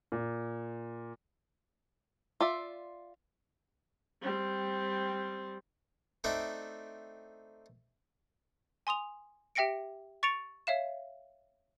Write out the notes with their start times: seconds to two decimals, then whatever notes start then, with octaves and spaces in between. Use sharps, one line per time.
0.12 A#2
2.41 F4 D5 E5
4.22 G3 C4
6.24 A3 C4 D4 D#4 E5 G5
8.87 G#5 C6 D#6 F7
9.55 G4 E5 G5 A#6 C#7 D7
10.23 C#6 A6 C#7 D7 F7
10.67 C#5 E5 F5 E7